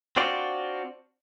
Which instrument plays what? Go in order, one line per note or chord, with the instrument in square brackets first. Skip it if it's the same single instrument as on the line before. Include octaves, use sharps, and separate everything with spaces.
[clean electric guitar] C4 D4 F4 F#4 D5